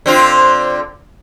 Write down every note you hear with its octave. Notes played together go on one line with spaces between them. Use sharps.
D3 C4 F4